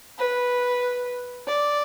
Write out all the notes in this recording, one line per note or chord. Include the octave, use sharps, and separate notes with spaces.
B4
D5